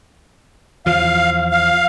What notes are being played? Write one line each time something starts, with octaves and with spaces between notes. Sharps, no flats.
E2 F3 F5
F5